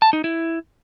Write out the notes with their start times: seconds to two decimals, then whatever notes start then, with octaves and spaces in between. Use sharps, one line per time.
0.02 A5
0.13 D#4
0.24 E4